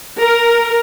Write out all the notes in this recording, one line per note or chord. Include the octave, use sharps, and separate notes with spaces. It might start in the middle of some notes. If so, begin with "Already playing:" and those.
A#4